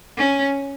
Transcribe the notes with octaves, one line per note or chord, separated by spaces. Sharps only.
C#4